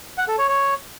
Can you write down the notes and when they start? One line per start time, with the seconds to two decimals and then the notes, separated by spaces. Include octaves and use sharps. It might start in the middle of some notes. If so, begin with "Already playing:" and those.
0.18 F#5
0.28 A4
0.38 C#5
0.48 C#5